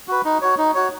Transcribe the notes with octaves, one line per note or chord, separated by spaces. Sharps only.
F#4 B4
D#4
F#4 C#5
D#4
F#4 C#5